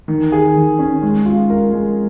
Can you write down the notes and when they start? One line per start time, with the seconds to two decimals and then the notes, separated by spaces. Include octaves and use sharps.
0.08 D#3
0.32 G#4
0.56 D#3
0.79 C#4
1.03 G#3
1.26 F4
1.50 A#4
1.73 G#3